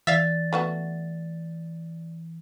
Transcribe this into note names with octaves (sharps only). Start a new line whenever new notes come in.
E3 D5 E5 F5 A6
A3 B3 F#4